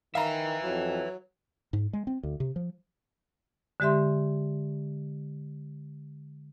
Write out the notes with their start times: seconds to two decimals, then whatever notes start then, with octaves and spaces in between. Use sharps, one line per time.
0.15 D#3 B4 E5 F5 A#5
0.63 F2 F#3
1.73 G#2
1.93 G#3
2.07 C4
2.23 D2
2.40 C3
2.56 F3
3.80 D3 G#3 G4 E5 C6